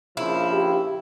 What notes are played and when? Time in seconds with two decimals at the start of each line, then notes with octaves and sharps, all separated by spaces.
0.17 A#1 C#3 F3 E4
0.51 G4